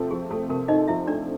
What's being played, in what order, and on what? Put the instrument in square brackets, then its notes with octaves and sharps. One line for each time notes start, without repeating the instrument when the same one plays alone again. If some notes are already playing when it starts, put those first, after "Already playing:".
Already playing: [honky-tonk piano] C3 F3 A3 C4
[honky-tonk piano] F3 [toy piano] G#4
[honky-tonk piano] A3 [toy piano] A4
[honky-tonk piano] C3 [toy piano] A#4
[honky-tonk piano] C4 [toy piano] D#4 D#5
[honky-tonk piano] F3 [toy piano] E4 E5
[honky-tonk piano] A3 [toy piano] D4 D5